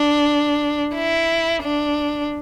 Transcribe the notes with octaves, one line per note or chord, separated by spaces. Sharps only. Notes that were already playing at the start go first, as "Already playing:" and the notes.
Already playing: D4
E4
D4